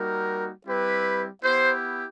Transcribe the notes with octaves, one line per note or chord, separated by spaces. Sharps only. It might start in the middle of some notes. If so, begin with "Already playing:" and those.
Already playing: G3 A#3 D#4 F#4 A#4
G3 C4 E4 G4 B4
B3 E4 G4 C5